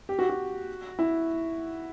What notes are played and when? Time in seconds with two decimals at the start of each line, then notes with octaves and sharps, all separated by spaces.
0.09 G4
0.19 F#4
0.29 F#4
0.99 E4